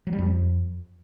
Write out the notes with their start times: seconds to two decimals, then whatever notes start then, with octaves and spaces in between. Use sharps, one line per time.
0.07 F#3
0.13 G3
0.19 F2